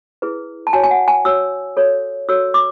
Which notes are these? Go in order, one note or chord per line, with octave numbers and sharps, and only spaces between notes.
E4 G#4 B4
A5
F#4 C#5 G#5
G#5
F#5
G#5
F#4 C#5 E6
F#4 A4 C#5
F#4 A4 C#5 E6
D6